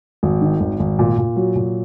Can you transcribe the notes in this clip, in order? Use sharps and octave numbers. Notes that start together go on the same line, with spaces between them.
G#1
D#3
G#1
G#1
A#2
A#2
F#3
A#2